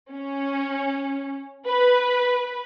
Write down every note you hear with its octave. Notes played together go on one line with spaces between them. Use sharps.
C#4
B4